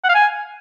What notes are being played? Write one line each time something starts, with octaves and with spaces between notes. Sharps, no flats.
F#5
F5
G#5